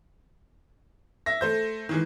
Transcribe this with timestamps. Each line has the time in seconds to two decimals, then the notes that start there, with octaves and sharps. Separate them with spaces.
1.26 E5 A#6
1.41 A3 C5 G6
1.89 D#3 E3 G#3